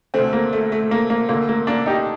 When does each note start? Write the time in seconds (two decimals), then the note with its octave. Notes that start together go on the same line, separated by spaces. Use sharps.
0.14 D2 D3 A3 C4
0.33 A#3
0.53 A3
0.72 A3
0.91 A#3
1.10 A#3
1.29 D2 D3 A#3
1.49 A#3
1.67 A#3 D4
1.86 D#4 G4